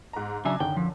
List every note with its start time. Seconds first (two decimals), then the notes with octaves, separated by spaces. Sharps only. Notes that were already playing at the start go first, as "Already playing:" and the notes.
0.13 G#2 A#5
0.45 C#3 F#3 D4 E5 G#5 A#5
0.60 F#2 D3 D#3 G5
0.77 F3